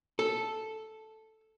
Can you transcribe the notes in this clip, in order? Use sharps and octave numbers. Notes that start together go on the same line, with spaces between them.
A4